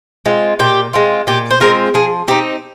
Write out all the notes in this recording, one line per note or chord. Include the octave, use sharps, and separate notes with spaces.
G#3 C4 F4
A#2 G4
G#3 C4 F4
A#2 G4
C5
G#3 C4 F4 A#4
F3 G#4
C4 D#4 G4